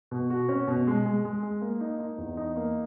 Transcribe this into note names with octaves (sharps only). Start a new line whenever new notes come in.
B2
F#4
C#4
B2
G#3
G#3
G#3
G#3
A#3
D#4
D#4
E2
D#4
A#3